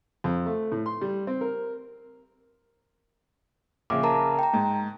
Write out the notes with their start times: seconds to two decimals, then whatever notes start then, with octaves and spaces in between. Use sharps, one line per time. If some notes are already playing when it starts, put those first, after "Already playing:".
0.24 F2
0.46 A3
0.72 A2
0.86 C6
1.01 G3
1.27 C4
1.41 A#4
3.90 A#1 C#3 D6
4.03 A#4 A5 A#5
4.39 G5 A#5
4.53 G#2